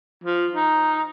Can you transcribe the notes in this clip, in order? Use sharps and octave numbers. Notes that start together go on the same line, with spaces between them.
F3
D#4